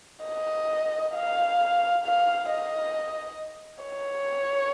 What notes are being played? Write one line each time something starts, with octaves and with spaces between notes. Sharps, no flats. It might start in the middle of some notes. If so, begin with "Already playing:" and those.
D#5
F5
F5
D#5
C#5